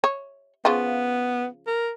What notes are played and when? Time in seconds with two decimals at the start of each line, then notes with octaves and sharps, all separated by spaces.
0.04 C#5
0.65 C#3 F3 B3 F4
1.67 A#4